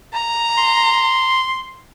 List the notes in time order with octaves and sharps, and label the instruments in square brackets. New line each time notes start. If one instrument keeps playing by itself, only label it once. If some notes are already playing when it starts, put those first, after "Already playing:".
[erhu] A#5
[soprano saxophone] C6